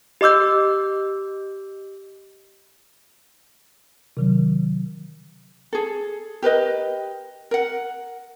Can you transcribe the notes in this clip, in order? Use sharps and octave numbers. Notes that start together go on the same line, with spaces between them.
G4 D#5 D6 E6 G6
C3 D#3 F#3
G#4 A4
G4 A#4 B4 D#5
A#4 F#5